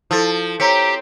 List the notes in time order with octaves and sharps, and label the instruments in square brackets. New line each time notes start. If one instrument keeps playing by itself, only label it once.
[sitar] F3 [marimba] E4 A4
[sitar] C4 [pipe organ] G4 [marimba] C#5 [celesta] A#5 B6